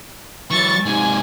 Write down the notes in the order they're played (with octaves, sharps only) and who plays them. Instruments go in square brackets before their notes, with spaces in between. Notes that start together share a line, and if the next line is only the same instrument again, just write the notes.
[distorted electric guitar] E3 F#3 [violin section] C#6 A6
[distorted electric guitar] G#2 C3 [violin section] G#5